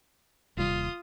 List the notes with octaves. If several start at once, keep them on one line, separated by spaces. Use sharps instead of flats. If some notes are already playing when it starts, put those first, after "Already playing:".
D#1 C3 G3 F4 D#6